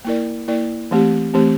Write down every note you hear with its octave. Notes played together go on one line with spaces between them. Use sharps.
A#3 E4 A#4 D5
A#3 E4 A#4 D5
E3 A3 C4 G4
E3 A3 C4 G4